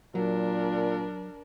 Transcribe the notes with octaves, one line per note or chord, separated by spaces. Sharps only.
A#2 F#3 D4 A#4